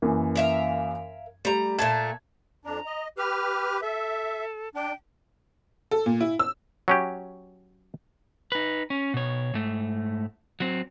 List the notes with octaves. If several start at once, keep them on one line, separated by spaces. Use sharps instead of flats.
F#2 E3 A#3
A#4 E5 F5
G3 A3 A#5
A#2 A3 A5 G#6
F2 D4 A#5
D#5
G4 B4 F6
A4 E5
D4 G5
A4
A#2
E4
E6
F#3 C#4 G4
D#4 B4
C#4
B2 C#5
G#2 A3
F#3 C4